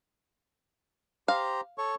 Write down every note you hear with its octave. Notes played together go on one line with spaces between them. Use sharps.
G4 C5 F5 A#5
A4 C#5 C#6